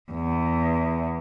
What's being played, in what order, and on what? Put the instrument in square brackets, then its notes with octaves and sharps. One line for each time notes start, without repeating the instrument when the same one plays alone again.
[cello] E2